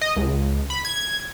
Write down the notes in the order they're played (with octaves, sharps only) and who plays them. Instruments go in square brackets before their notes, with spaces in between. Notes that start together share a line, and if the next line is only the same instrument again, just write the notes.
[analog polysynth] D#5
C#2
B5
G#6